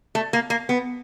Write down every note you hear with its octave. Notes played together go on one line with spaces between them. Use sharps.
A3
A#3
A#3
B3